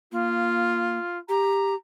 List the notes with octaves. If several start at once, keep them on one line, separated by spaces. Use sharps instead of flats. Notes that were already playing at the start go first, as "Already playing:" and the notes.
A#3 F4
G4 A#5